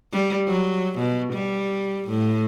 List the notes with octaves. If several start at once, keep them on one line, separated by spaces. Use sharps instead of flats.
G3
F#3
B2
G3
A2